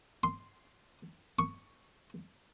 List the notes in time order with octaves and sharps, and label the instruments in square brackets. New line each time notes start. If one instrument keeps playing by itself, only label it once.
[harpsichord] C6
C#6